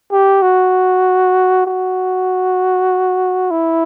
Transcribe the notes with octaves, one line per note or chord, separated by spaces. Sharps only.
G4
F#4
F#4
E4